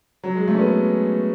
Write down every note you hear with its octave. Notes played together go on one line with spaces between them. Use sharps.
F#3
G#3
A3
C#4
B3